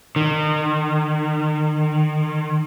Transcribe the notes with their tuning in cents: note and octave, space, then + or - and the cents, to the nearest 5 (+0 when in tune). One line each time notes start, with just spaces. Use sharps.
D#3 -35